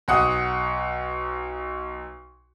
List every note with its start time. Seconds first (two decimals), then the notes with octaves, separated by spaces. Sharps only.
0.08 B1 F#5 D#6